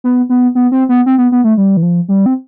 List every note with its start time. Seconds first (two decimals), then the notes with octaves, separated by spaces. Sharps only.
0.04 B3
0.29 B3
0.55 B3
0.72 C4
0.89 B3
1.06 C4
1.18 B3
1.32 B3
1.44 A3
1.57 G3
1.77 E3
1.82 F3
2.08 G3
2.26 C4